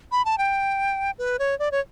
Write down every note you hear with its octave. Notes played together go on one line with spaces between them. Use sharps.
B5
A5
G5
B4
C#5
D5
C#5